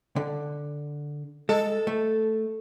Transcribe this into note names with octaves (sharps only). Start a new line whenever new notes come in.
D3
G#3 A4
A3